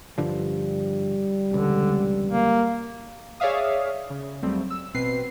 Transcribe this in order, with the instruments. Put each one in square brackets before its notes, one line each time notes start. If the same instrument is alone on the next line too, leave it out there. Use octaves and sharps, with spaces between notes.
[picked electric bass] G2 D3 F3 [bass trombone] G3
[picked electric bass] E1 C#2 [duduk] D3
[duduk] A#3
[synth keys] G#4 C#5 D5 E5 F5 D#6
C#3
D#2 F#3 G3 A3 C4
E6
A1 B2 C4 B4 C7